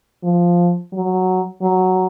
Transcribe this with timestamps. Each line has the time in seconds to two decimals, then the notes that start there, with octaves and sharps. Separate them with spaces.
0.23 F3
0.93 F#3
1.62 F#3